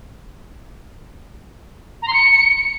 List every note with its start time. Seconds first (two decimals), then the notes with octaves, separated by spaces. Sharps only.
2.02 A#5
2.07 C6
2.13 C#7